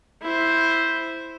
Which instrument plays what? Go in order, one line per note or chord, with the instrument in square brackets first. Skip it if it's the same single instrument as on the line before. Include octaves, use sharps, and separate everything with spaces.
[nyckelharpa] E4 C5